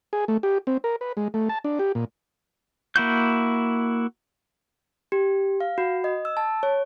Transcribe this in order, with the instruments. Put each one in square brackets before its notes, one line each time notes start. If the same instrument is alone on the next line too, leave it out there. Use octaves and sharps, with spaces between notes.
[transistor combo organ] G#4
A3
G4
C4
A#4
B4
G#3
A3
A5
D4
G4
A#2
[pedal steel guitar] A#3 E4 F#4 G6
[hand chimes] G4
F5
F#4
D#5
E6
A5
C#5